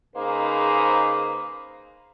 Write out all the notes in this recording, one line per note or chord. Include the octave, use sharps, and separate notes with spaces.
C#3 A#3 D#4 G#4 B4 C5